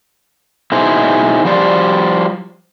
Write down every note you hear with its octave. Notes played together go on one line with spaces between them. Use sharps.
B2 D#4 E4 G#4 C5
F3 G3 C5 D5